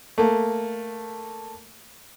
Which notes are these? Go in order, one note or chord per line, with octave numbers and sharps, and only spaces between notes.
A3 A#3